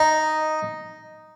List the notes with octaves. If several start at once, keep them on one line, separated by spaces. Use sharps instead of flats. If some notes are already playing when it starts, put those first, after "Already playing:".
Already playing: D#4